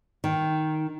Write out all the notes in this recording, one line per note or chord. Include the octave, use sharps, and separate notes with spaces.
D#3